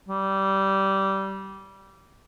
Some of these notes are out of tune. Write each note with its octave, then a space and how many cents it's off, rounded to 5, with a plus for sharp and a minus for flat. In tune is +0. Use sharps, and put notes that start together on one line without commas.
G3 -20